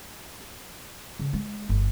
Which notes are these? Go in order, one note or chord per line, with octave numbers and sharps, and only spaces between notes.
C#3
G#3
G1